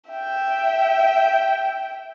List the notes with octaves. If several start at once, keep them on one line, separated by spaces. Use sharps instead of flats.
E5 G5